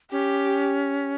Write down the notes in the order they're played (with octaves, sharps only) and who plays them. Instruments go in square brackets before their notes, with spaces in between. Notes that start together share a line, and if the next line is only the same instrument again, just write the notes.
[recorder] C#4 [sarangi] G4